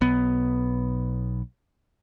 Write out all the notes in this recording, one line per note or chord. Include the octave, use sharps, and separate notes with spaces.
B1 B3